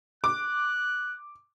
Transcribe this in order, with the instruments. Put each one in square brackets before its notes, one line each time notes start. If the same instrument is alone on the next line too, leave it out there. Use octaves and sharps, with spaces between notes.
[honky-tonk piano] D6 [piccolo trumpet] F#6